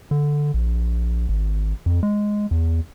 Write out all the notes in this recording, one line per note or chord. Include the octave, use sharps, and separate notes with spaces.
D3
A#1
G#1
F2
G#3
E2